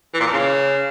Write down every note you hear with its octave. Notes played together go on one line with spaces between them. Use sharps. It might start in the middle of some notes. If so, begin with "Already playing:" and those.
E3
A#2
F2
C#3